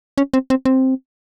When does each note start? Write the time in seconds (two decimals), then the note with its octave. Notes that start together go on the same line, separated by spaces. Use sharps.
0.18 C#4
0.33 C4
0.50 C4
0.65 C4